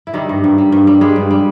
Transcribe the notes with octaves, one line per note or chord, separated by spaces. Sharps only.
E4
D#3 G3 D#4
G2
G2
G3
G2
G3
G3 G#3 G#4
G2
G3